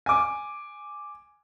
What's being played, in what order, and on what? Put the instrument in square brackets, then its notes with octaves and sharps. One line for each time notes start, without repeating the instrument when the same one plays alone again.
[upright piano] G#5 D6